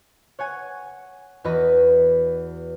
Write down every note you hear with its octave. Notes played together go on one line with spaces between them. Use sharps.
C#5 F#5 G#5
E2 F#4 B4 D#5 B5